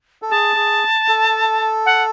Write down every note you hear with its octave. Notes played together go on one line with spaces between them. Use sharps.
A4
G#4 A5
G#4
A4
F#5